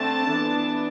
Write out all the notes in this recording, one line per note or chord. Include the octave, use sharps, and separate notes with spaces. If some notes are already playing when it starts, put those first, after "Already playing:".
Already playing: D3 A3 C4 A5
E3 B3 D4